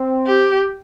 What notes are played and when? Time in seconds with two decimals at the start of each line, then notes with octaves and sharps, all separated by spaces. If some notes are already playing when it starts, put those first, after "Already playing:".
Already playing: C4
0.27 G4